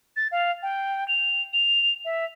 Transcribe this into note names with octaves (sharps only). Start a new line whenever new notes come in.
A6
F5
G5
F7
F7
E5